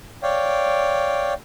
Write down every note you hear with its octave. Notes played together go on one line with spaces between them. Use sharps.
C#5 D5 F5 G5